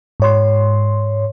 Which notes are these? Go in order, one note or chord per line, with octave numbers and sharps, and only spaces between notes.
G#2 C#5 C6